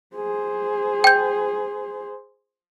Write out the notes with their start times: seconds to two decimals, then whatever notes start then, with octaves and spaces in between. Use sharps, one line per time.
0.16 G#4 C5
1.04 G5 G6